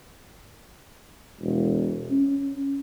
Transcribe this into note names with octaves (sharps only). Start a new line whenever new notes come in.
E1
C#4